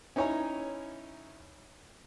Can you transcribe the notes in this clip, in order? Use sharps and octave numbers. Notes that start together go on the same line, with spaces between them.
C#4 D#4 E4 C#5 G#5 A#5